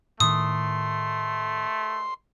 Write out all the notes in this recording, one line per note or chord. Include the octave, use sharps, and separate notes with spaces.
A2 D#3 A3 C6 D#6